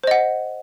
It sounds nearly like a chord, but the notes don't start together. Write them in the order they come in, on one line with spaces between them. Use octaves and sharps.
C5 D#5 F#5